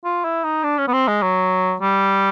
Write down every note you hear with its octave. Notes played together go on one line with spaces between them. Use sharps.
F4
E4
D#4
D4
C#4
B3
C4
G#3
F#3
G3